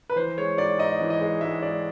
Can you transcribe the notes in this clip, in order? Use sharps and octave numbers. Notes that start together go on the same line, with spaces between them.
B4
E3 C5
G#3 C#5
G#2 D5
G#2 D#5
E3
D#5
G#3
G#2 E5
G#2 D5